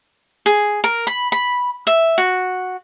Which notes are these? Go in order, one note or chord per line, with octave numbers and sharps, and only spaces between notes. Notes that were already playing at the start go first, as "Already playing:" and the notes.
G#4
A#4
B5
B5
E5
F#4